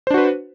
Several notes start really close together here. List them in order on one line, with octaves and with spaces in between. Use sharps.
C5 D4 F#4 B4